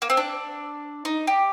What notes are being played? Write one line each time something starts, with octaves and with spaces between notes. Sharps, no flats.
A#3
C4
D4
D#4
G4